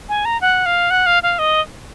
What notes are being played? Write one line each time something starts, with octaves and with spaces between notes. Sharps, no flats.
G#5
A#5
F#5
F5
F#5
F5
F5
D#5